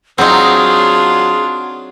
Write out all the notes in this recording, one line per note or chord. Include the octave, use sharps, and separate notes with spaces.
F#3 C4 D4 D#4 F4 G#4